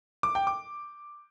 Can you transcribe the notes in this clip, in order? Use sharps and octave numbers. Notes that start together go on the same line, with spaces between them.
D6
G5
D6